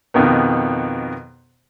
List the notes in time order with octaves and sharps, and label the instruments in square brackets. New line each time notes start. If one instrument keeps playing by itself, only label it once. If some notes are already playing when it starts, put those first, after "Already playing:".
[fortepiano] F2 B2 D#3 B3